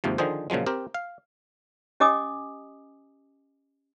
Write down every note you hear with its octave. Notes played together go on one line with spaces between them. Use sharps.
D#2 G#2 C3 F3
D3 D#3 F3 G#4 C5
A#2 C#3 F3 F#3 G#3
C4 G4 A#4
F5
C#4 G4 D#5 G#5 D6 D#6